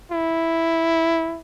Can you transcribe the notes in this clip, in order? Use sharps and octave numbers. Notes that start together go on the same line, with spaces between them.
E4